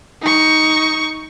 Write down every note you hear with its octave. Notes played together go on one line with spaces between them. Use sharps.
D#4 C#6